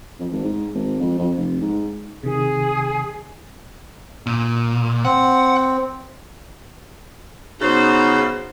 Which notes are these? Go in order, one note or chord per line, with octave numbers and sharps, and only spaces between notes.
F2
G#1
G#2
G#1
F2
F2
F1
G#2
C3 D#3 G#4
A#2
C4 F#5
C#3 B3 D#4 F#4 C5